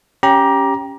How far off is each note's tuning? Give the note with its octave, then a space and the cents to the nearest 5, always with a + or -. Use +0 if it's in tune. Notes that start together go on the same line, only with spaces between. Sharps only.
C#4 +0 G4 +0 A#5 +20